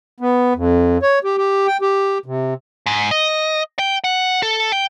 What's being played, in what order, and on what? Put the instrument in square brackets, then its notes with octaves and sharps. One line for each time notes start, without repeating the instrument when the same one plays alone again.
[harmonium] B3
F2
C#5
G4
G4
G5
G4
C3
[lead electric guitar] G#2
D#5
G5
F#5
A4
G5